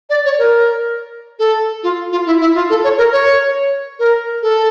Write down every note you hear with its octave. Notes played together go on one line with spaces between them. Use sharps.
D5
C#5
A#4
A4
F4
F4
E4
E4
F4
A4
C#5
A#4
C#5
A#4
A4